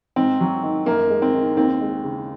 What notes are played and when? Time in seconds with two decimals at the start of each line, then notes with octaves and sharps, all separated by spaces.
0.16 G#2 C4
0.41 F#3
0.63 D#3
0.86 F#2 A#3
1.10 G#3
1.22 C4
1.34 D#3
1.57 D#2 C4
1.81 G#3
2.04 C#3